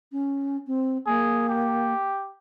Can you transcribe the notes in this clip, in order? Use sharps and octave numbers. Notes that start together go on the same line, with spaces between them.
C#4
C4
A#3 G#4
G4